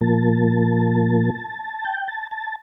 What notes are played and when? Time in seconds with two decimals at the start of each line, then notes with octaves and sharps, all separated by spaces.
0.01 A#2 F3 A#3 A5
1.85 G5
2.08 A5
2.31 A5